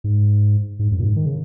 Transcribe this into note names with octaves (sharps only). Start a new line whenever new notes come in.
G#2
G#2
F#2
A#2
G#2
D#3
C#3